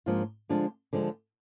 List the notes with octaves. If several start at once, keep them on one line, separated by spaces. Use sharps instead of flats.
G#2 F3 A#3 D4 F4
D3 F3 G#3 D4 F4
D3 F3 G#3 D4